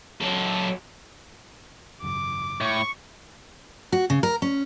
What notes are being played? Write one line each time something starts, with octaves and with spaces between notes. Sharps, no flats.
F#3 A4
G#1 F#2 C#3 D6
A2 C#6
F#4
C#3
A#4
C#4